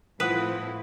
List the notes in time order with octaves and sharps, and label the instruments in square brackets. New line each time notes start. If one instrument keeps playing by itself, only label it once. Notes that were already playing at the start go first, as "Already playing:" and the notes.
[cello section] A2 C4 E4 [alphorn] F3 [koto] B4 [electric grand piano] F#5 D#6 B6